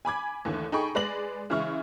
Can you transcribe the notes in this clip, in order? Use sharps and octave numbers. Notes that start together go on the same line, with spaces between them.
G#5 B5 D6 G#6
D#2 D3 E3 A3
D#4 G#4 A4 G5 B5 C#6
G#3 B4 D5 A#6 F#7
C#3 E3 G#3 E4 C#6 F6